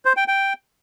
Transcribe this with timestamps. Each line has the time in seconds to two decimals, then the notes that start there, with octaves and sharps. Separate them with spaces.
0.05 C5
0.17 G5
0.28 G5